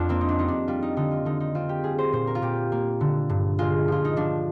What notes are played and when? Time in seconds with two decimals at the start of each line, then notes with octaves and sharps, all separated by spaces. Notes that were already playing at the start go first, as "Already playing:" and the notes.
Already playing: F2 D4 F4
0.09 A#3 C4
0.21 D#4
0.29 D4
0.39 G3 D#4
0.48 D4
0.68 G3 F4
0.82 D#4
0.97 D3 D#4
1.11 F4
1.25 D3 D#4
1.40 D#4
1.55 C4 F4
1.69 G4
1.84 G3 G#4
1.98 C5
2.12 A#2 C5
2.27 A#4
2.35 F4
2.42 A#2 G4
2.72 A#3
3.01 D3
3.29 G2
3.59 G#3 F4
3.88 F3 F4
4.05 D#4
4.16 F3 D4